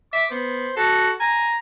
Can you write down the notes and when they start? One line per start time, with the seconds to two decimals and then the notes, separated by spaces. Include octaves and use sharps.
0.13 E5 D6
0.31 B3 C5
0.77 F#4 A4
1.20 G#5 A#5